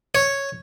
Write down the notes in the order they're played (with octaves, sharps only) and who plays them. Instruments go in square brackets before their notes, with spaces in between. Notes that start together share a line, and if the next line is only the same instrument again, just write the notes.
[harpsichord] C#5